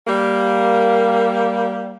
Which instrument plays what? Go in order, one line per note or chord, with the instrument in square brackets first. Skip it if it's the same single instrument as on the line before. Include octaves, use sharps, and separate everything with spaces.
[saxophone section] G3 A#3